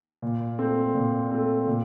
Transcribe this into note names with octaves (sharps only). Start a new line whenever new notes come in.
A#2
A3 C4
A#2
A3 C4
A#2